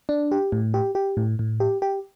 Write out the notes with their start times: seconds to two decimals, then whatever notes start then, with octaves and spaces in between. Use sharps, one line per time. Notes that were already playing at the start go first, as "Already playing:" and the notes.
0.09 D4
0.32 G4
0.52 A2
0.74 G4
0.95 G4
1.17 A2
1.39 A2
1.60 G4
1.82 G4